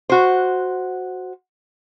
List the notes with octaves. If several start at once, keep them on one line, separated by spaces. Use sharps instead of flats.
F#4 C5